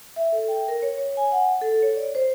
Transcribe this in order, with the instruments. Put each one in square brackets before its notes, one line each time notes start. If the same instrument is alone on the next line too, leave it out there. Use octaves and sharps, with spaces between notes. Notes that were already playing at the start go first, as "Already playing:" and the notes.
[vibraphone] E5
A4
G5
A#4
C#5
C#5
G#5
F#5
A4
C#5
D5
C5